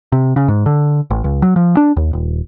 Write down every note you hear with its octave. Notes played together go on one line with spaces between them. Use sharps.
C3
C#3
G#2
D3
A1
C#2
F#3
F3
D4
D#2
D#1